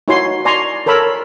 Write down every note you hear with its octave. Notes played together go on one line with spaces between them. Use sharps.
D#4 E4 F#4 C#5 G#5 C6
D5 G#5 A#5 C6 C#6
A4 A#4 C#5 B5 E6